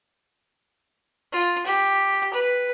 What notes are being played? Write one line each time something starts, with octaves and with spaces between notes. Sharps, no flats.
F4
G4
B4